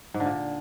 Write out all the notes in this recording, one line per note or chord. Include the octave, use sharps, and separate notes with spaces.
G#2
D3
A#2